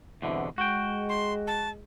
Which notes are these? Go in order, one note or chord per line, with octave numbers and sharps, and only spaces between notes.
E2 G2 B2 D3 C4 E4
G#3 F#4 G5
C6
A5